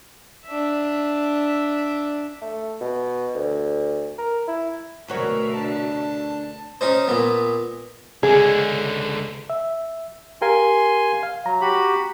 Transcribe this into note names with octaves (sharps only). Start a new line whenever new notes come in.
D4 E5
A3
B2
D2
A#4
E4
D2 B2 F#4 A#4 C#5 E5
D4 A5
C#4 D#4 C5
A#2 B3
C#2 D3 G#4
E5
G4 A#4 F5 G#5 C6
F5
F#3 A#5
F#4 G4 B5